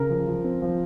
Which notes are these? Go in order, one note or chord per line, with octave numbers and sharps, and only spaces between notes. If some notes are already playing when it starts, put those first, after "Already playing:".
Already playing: C#3 A#4
F3
F3
C4
F3